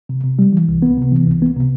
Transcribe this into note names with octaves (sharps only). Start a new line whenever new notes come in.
C3
C3
G3
E3
C2
B3
C3
E3
C2
B3
C3